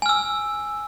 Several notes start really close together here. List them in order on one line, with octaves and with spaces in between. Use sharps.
G#5 F6 E6